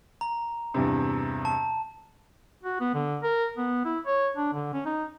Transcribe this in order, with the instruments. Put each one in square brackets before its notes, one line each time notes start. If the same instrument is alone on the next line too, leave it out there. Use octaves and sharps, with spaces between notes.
[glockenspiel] A#5
[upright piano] E2 G2 C3
[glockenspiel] A5
[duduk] F#4
B3
D3
A#4
B3
E4
C#5
D4
D3
C#4
D#4